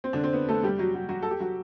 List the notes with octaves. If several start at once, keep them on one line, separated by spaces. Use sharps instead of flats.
C4
D3 D4
C4
B3
A3 A4
G3 G4
F#3 F#4
F#3 F#4
F#3 F#4
A4
G4
F#3 F#4